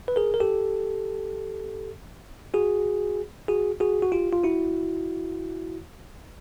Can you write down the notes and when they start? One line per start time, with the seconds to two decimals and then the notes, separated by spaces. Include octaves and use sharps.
0.08 B4
0.16 G#4 A#4
0.34 A#4
0.40 G4 A4
2.54 F#4 G#4
3.48 F#4 G#4
3.80 F#4 G#4
4.03 F#4
4.12 F4 G4
4.33 F4
4.43 E4 F#4